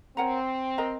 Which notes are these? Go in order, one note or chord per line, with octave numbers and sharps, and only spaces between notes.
C4 A#4 C#5 F#5 A#5
A#4 D#5 A#5